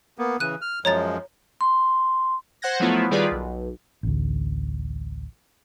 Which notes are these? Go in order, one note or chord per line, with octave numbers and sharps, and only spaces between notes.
A#3 B3
C#3 E3 F#6 D#7
F6
F#2 F3 G#3 C#5 A#5 A6
C6
C5 F#5 F#6 G#6 A#6
F3 F#3 A3 B3 E4 F4
D#3 G3 F4 G#4 B4 D5
B1
A1 D2